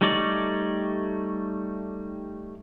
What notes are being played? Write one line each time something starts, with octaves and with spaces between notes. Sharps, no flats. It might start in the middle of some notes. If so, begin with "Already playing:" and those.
G3 A3 D#4 C#5 D5